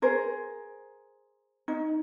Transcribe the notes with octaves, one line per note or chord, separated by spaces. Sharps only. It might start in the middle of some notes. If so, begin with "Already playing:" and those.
G#4 A#4 C5
D#4